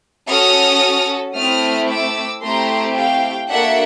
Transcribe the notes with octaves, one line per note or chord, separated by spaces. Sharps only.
C#4 F#4 A4 D#6 F6
A3 C4 E4 D#6 F6
D6 E6
A3 C4 E4 G4 A#5 C6
F5 G5
A#3 D4 F#4 A4 E5 F#5